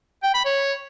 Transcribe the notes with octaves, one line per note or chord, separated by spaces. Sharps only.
G5
B5
C#5